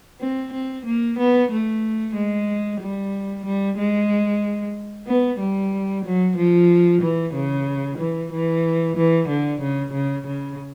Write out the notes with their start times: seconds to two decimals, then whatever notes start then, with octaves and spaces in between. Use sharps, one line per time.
0.21 C4
0.53 C4
0.86 A#3
1.19 B3
1.51 A3
2.15 G#3
2.81 G3
3.45 G3
3.78 G#3
5.07 B3
5.39 G3
6.05 F#3
6.37 F3
7.01 E3
7.34 C#3
7.98 E3
8.32 E3
8.96 E3
9.29 D3
9.61 C#3
9.93 C#3
10.26 C#3